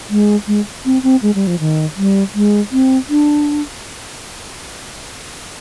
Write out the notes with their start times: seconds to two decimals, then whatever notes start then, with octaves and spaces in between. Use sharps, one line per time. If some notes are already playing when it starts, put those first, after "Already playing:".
0.10 G#3
0.47 G#3
0.85 C4
1.03 C4
1.22 G#3
1.35 G3
1.47 F3
1.60 D#3
1.97 G3
2.35 G#3
2.72 C4
3.09 D4